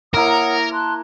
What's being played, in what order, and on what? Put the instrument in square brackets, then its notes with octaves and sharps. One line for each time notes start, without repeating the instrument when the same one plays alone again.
[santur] A#3 E4 A#5 [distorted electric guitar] A#4 [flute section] C#5 F#5 D#6
[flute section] A5 C6 F#6